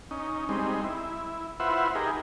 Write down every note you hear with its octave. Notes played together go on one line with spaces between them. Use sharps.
C#4 D#4
G3 G#3 C4 D#4
E4
E4 F4 B4 C5 E5 F#5
D#4 G4 G#4 A#4